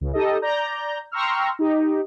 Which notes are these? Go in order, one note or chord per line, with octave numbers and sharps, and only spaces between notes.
C#2
D#4 G4 A4 D#5
D5 A#5 G6
G5 A#5 C6 C#6 E6 F6
D#4 G4